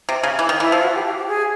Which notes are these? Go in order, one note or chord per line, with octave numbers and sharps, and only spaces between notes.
C3
C#3
E3
D#3
E3 E4
F3 F4
F#4
G4
G4
G4
G#4